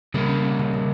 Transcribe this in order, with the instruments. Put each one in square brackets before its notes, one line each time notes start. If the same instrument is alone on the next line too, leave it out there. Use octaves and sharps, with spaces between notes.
[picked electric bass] C#3 [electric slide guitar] G3 A#3
[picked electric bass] C#4
C#4
C#3
C#3